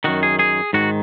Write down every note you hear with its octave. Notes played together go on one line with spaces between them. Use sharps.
F#2 D#3 F#4
G#4
G#4
G#2 D#3 F#4